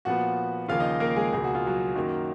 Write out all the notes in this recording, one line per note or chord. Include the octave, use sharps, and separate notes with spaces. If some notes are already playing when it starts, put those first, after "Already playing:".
A#2 F3 B3 F#4 F#5
D#2 C#3 F3 A#3 F4 F5
D#4 D#5
A#3 A#4
G#3 G#4
C#2 B2 A#3 G#4
F#4
F4
F#3 F#4
F#2 D#3 A#3